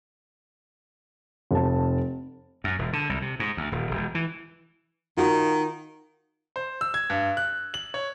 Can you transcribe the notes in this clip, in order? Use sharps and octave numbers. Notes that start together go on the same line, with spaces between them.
F1 A5
F#2
E1
D3
C2
C3
G#2
D2
D#1
E1
E3
D#3 F4 F#4 A#4
C5
E6
G#6
G2
F#6
F#7
C#5